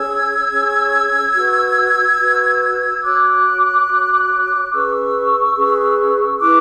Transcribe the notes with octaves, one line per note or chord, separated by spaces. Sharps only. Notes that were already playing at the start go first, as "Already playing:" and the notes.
Already playing: C#4 G#4 C#5 E6 G#6
C#4 G#4 C#5
F#4 B4
F#4 B4
F#4 C#5 D6 F#6
F#4 C#5
C#4 G#4 B4 C#6 E6
C#4 G#4 B4
E4 B4 D6 F#6